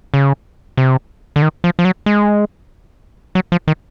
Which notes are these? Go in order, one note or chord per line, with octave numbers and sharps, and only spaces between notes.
C#3
C3
D3
D#3
F3
F3
F#3
G#3
F#3
F3
D#3